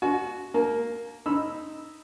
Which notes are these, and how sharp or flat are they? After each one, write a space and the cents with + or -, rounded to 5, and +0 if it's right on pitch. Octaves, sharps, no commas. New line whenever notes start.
F#4 +0 G#5 +45
A#3 +0 A5 -45
D#4 +0 B5 +0 E6 +0